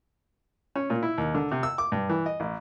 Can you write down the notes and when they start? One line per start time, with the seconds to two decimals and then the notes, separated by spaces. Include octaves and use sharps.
0.76 C#4
0.90 A#2
1.03 E4
1.18 D#2
1.35 D3
1.51 C3
1.63 E6
1.78 D6
1.92 G2
2.09 E3
2.26 D#5
2.40 A1